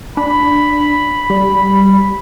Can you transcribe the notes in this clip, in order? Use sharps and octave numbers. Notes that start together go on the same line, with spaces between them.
D4 B5
G3